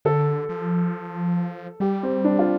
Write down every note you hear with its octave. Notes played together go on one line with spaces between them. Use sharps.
D3 A4
F3
G3 G4
C4
D4
F4